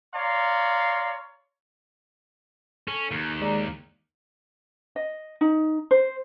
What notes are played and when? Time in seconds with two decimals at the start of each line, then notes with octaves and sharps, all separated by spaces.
0.14 C#5 D5 F5 A#5 C6
2.88 C#4 A4
3.11 D#2
3.41 G#3 D5 A#5
4.96 D#5
5.41 D#4
5.91 C5